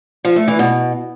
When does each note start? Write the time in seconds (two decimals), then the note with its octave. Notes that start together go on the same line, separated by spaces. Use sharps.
0.25 F3
0.36 A3
0.48 E3
0.59 B2